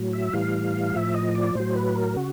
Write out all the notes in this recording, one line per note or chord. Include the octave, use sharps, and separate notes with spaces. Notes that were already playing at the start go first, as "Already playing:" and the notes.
Already playing: A2 F#3
E5
A2 E3 G3 F5
A2 F3 E5
D#5
D5
A2 F#3 C5
B4
A#4
C#3 F#4